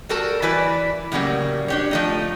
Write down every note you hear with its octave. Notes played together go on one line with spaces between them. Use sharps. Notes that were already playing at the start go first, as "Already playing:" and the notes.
G3 F#4 A4 A#4 A5
E3 E4 B4 D5
A2 C#3 F#3 G3 A#3
D4 G4 C#5
F3 A3 D#4